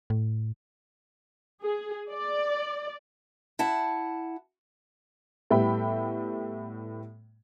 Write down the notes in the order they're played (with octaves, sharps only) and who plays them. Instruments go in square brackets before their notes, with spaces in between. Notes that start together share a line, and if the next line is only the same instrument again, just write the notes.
[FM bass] A2
[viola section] G#4
D5
[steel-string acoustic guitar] E4 F#5 A5
[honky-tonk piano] A2 G3 B3 E5 G5 B5